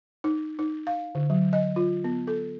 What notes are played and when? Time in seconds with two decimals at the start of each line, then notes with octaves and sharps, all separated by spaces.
0.24 D#4
0.59 D#4
0.87 F5
1.15 D3
1.30 F#3
1.53 D#5
1.76 F4
2.04 B3
2.27 A4